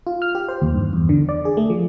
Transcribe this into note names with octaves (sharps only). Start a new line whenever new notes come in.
F4
F6
G4
C5
D#2
G2
E2
D3
D5
G#4
A3
F3